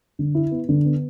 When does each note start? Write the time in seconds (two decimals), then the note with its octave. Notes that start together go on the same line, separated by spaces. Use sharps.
0.19 D3
0.35 E4
0.51 B3
0.69 D3
0.85 B3